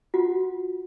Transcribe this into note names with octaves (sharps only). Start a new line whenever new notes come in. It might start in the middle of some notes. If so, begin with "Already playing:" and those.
F4 F#4 F#5